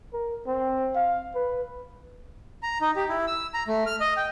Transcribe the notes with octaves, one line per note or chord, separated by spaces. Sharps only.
A#4
C4
F5
B4
A#5
D#4
G4
E4
E6
A#5
A3
F6
D#5
G5